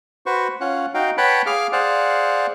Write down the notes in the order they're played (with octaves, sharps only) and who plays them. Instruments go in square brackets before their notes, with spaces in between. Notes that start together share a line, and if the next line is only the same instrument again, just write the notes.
[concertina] F#4 B4 C5 C#6
C#4 F4 F#5
D#4 F#4 F5 G5
B4 C#5 F#5 G5 A5 B5
G#4 F5 D6 F6
G#4 C5 D5 F5 F#5